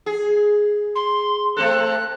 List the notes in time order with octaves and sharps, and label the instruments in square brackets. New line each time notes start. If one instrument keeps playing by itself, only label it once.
[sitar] G#4
[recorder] C6
[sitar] A3 C4 A4 [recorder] F#6